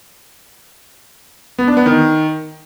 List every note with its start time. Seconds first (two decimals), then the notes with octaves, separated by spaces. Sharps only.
1.58 B3
1.68 D4
1.77 B3
1.86 D#3